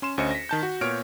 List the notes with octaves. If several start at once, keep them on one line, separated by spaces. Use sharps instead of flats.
C#4 C6 E7
D2 C#4 C5 D#5 C#7
A#6 B6
D#3 A5 G6
F#4
A#2 B3 C#5 F6 D7